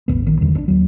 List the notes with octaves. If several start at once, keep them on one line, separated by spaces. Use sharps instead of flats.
A1 E2 A2 B3
A#1 D#3
E2 D3 G3
G2 D4
D#2 F#3